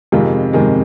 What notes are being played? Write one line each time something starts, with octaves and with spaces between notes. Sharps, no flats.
F2 C3 D#3 G#3 F4
F2 C3 D#3 G#3